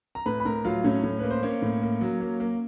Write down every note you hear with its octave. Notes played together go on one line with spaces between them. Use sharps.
A#5
A2 B4 B5
B5
A2 A#4 A#5
F#3 F4 F5
A2 C#4 C#5
A2
A#3 B4
C5
A#3 C#4 C#5
A2
A#3
F#3
A#3
A#3